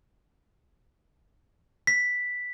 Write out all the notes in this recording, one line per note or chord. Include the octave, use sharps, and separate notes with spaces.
B6